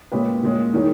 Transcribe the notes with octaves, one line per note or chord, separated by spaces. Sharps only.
A#2 G#3 C#4 G4 B4
A#2 G#3 C#4
D#3 G3 C#4 G#4